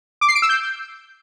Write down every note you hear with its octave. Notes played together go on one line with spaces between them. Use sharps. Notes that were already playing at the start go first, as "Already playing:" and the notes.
D6
C7
D7
E6
G6